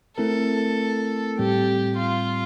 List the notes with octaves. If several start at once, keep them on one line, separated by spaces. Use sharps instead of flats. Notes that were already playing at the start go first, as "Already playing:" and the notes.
A3 C4 E4 A4 A#4
A2 G3 C4 G4
F4